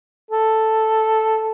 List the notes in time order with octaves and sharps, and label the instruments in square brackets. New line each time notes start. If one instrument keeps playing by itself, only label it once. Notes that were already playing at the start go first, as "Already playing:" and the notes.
[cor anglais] A4